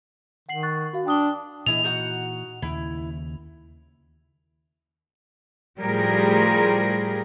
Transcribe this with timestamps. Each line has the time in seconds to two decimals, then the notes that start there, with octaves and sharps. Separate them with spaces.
0.49 D#3 F#5 C7 F#7
0.63 C#6 F#6 A6
0.93 F#4 F5
1.06 D4 G5 D#6 G7
1.67 A#2 E3 E4 G#4 D#5 F7
1.84 D#4 F#4 F#5
2.62 D#2 C#3 E4
5.78 A2 F3 G3 G4 G#4 A#4